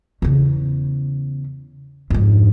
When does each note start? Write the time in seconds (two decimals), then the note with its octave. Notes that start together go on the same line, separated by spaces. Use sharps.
0.22 E2 C#3
2.10 F2 G#2